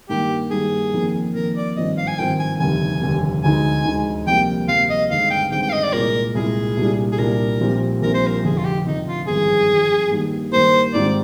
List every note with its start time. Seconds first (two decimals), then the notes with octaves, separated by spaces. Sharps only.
0.09 G2 D#3 G3 A#3 G4
0.51 G2 D#3 G3 A#3 G#4
0.94 F2 D#3 A#3
1.35 F2 D#3 A#3 A#4
1.56 D5
1.77 G#1 G2 F3 C4 D#5
1.97 F5
2.07 G#5
2.18 G#1 G2 F3 C4 G5
2.39 G#5
2.60 F1 D#2 D3 G3 G#5
3.01 F1 D#2 D3 G3
3.44 D2 D3 G#3 D#4 G#5
3.85 D2 D3 G#3 D#4
4.27 F2 C3 G3 A#3 G5
4.68 F2 C3 G3 A#3 F5
4.90 D#5
5.11 G1 G2 D#3 G#3 C4 F5
5.31 G5
5.51 G1 G2 D#3 G#3 C4 G5
5.63 G5
5.69 F5
5.73 D#5
5.83 D5
5.93 C2 A#2 G#3 A#4
6.35 C2 A#2 G#3 G#4
6.77 C2 A#2 G3 D4
7.12 G#4
7.18 C2 A#2 G3 D4 A#4
7.61 A#1 A#2 G3 C4 F4
8.02 A#1 A#2 G3 C4 F4 A#4
8.14 C5
8.27 A#4
8.44 F1 F2 D3 G#4
8.58 F4
8.65 G4
8.85 F1 F2 D3 D#4
9.07 F4
9.27 G#1 G2 F3 G#4
9.69 G#1 G2 F3
10.11 G2 D#3 G3 A#3
10.52 G2 D#3 G3 A#3 C5
10.94 G#2 D#3 G3 C4 F4 D5